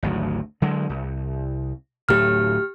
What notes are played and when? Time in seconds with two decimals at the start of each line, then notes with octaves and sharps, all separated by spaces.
0.03 G#1 D2 F#3
0.62 D3 F#3 G#3
0.89 C2
2.09 D1 A2 F#3 G4 F6